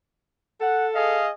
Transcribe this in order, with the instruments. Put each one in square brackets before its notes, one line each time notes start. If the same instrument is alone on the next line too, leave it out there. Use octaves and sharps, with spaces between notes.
[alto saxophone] A4 [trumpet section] F#5
[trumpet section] G#4 D#5 F5